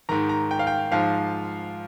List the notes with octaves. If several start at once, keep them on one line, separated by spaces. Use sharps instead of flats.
G#2 D#3 A#5
A#5
G5
F5
G5
G#2 F3 F5